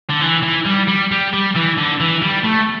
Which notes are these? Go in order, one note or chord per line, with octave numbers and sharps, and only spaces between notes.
D3
E3
E3
G3
G3
G3
G3
E3
D3
E3
G3
A3